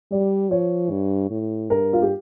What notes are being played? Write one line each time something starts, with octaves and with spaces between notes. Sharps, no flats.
G3 D5
F3 C#5
G2
A2
G2 A#4
F4
G4